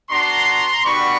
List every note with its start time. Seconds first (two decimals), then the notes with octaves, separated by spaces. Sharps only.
0.10 B3 D4 F#4 A#5 C6
0.84 G3 B3 D4 F#4 B5 C#6